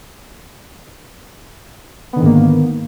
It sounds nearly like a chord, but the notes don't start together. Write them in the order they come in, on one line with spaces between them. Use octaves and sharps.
B3 D3 D#3 G#2 A#3